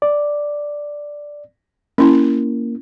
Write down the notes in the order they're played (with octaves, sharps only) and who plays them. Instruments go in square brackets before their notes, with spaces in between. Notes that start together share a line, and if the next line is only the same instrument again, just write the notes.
[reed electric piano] D5
[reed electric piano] A#3 [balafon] C#4 E4